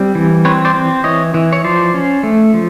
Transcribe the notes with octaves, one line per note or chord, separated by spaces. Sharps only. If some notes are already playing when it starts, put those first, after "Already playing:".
Already playing: G3 C4
E3
C4 B4 C#5
C5 D5
C4
E3 C#5 D#5
E3
C#5
F3 C5 D5
C#4
A3
F3